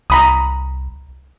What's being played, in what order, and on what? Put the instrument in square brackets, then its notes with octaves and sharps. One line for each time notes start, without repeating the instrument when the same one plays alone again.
[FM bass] C2 [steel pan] A#5 B5 D#6